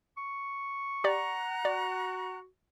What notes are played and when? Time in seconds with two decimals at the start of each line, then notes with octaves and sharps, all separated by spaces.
0.18 C#6
1.04 G4 D5 F#5 A#5 F#6
1.65 F#4 D5